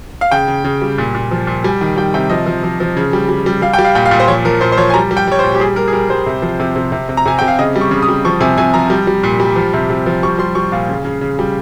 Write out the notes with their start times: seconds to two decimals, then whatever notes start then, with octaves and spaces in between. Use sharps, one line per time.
0.21 F5
0.31 C#3 G5
0.48 C#3
0.64 C#3
0.82 G3
0.98 A#2
1.15 A#2
1.31 F3
1.47 A#2
1.64 G3 G#5
1.81 D#3
1.97 G3 G5
2.14 C3 G5
2.30 F3 D#5
2.46 F3
2.64 F3
2.80 F3
2.97 C#3
3.13 G3
3.29 G3
3.46 G3
3.62 G3 F5
3.73 G5
3.79 G3
3.85 F5
3.95 A#2 G5
4.06 F5
4.11 A#2
4.20 C5
4.28 F3 C#5
4.45 F3 A#4
4.61 A#2 C5
4.72 C5
4.77 F3 C#5
4.90 G#5
4.94 G3 A#5
5.11 G3
5.17 G5
5.27 G3 C#5
5.39 C5
5.44 A#2
5.55 G4
5.60 G3 G#4
5.76 G3 A#4
5.88 G#4
5.93 G3 A#4
6.09 G3 C5
6.26 C3
6.42 F3
6.60 C3
6.76 C3
6.92 C3
7.09 C3
7.17 A#5
7.26 C3 G#5
7.39 C3 G5
7.48 F5
7.59 C#3 D#5
7.76 G3
7.81 C#6
7.91 C#3
8.02 D#6
8.09 G3
8.25 F3 C#6
8.41 C3 G#5
8.58 C3 G#5
8.74 F3 A#5
8.90 G3
9.07 G3
9.23 A#2
9.40 G3
9.56 F3
9.74 C3
9.90 C3
10.06 F3
10.23 G3 C#6
10.39 G3 C6
10.55 G3 C#6
10.72 A#2 F5
10.89 C#3
11.05 C#3
11.21 C#3
11.39 G3